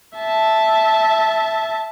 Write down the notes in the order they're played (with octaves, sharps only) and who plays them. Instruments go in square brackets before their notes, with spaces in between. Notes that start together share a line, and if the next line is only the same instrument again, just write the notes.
[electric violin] E5 A5